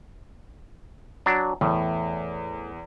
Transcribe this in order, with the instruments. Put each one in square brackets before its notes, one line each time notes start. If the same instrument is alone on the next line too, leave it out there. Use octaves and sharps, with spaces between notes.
[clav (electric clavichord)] F#3 D4
[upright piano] E2 [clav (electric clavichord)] A2